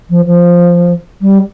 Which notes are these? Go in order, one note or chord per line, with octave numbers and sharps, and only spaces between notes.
F3
F3
G3